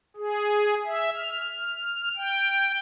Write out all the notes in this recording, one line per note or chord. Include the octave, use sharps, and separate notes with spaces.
G#4
E5
F6
G5